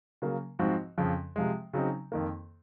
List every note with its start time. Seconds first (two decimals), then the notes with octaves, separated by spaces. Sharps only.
0.22 C#3 F#3 A#3
0.59 G#2 F3 C4 F#4
0.98 F2 C#3 F3
1.36 C3 F3 G#3
1.73 C#3 F#3 C4 D#4
2.12 F2 D#3 A#3